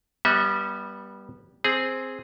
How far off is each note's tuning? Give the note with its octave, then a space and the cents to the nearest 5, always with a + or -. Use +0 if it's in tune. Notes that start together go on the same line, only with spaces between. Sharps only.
G3 +0 B3 -25 E5 -40
C4 +0 G#4 +0